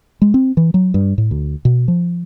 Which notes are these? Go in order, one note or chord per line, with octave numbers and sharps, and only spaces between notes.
G#3
C4
E3
F#3
G2
A2
D2
B2
F3